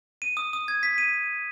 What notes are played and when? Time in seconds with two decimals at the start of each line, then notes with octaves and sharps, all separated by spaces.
0.22 D#7
0.37 D#6
0.53 D#6
0.68 G#6
0.83 B6
0.98 D#7